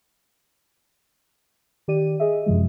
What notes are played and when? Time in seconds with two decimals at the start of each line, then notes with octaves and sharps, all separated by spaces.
1.88 D#3 G4 D5 D#7
2.20 G#4 D#5 E5
2.46 F#2 C3 F3 G#3